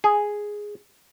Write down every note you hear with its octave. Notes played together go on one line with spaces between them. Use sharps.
G#4